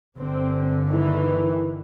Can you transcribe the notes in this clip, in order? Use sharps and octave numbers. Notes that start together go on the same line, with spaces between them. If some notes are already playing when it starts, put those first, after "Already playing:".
G1 D3 C4
D#3 E3